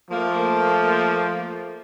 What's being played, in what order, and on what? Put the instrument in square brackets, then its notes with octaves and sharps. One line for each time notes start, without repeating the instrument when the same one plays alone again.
[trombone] F3 [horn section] A3 A#3